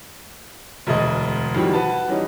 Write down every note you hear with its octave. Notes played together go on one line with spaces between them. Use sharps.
E1 D2 G#3 D#5
F2 B2 D#3 E3 G3
F#4 B4 A5
E3 G3 C#4 D#4